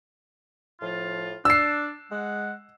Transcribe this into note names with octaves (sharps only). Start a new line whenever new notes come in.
A2 F3 F4
D4 E6 C7
G#3 F#5